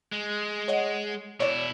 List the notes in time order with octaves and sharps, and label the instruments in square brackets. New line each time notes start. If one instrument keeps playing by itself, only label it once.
[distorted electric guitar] G#3
[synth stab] C#5 D#5 F#5
[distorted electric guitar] B2 E4 [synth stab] C#5 D5